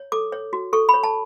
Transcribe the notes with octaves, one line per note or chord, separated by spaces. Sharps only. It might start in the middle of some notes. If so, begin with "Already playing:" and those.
Already playing: C#5
A4 D6
C#5
F#4
A4 C#6
B5
C#5
A5